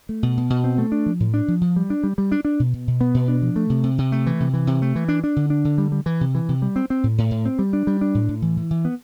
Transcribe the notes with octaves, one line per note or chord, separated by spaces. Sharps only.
A3
B2
B2
B2
C4
A3
D4
F3
A2
D4
F3
F3
G3
D4
G3
G3
D4
D4
B2
B2
B2
B3
B2
D4
F3
A3
C3
C3
C3
A3
E3
C3
E3
C3
A3
E3
D4
D4
D3
D4
D3
G3
G3
E3
C3
E3
C3
G3
C4
C4
A2
A2
A2
C4
G3
D4
G3
D4
A2
A2
E3
E3
E3
B3